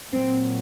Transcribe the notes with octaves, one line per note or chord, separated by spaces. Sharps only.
A#2 F#3 C4